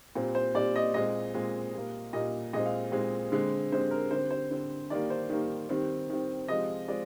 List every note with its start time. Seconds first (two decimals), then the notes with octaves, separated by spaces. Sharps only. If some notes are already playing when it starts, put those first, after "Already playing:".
0.15 A#2 G3 C4
0.35 C5
0.55 A#2 G3 C4 D5
0.76 D#5
0.94 A#2 G#3 C4 D#5
1.34 A#2 G#3 C4
1.74 A#2 G3 A#3
2.13 A#2 G3 A#3 D#5
2.53 A#2 G#3 C4 D#5
2.66 F5
2.92 A#2 G#3 C4
3.32 D3 G#3 C4
3.72 D3 G#3 C4 C5
3.91 A#4
4.11 D3 G3 C4 C5
4.30 C5
4.51 D3 G3 C4
4.90 D#3 G3 A#3 D5
5.10 C5
5.29 D#3 G3 A#3
5.69 D#3 G3 C4
6.10 D#3 G3 C4
6.48 C3 F3 G#3 C4 D#5
6.88 F3 G#3 C4 D5